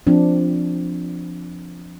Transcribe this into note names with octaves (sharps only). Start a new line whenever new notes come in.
F3 C4 D4